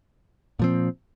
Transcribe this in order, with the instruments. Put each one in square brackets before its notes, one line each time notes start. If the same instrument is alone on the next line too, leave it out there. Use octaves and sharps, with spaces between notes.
[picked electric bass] A#2 F3 C4